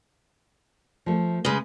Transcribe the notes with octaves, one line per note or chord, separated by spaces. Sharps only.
F3 A3
C#3 G#3 B4